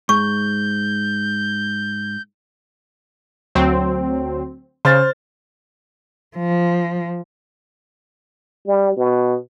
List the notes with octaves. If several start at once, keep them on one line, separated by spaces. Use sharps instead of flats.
G#2 C#6 G6
D2 F#3 C4
C#3 C5 F6 A6
F3
G3
B2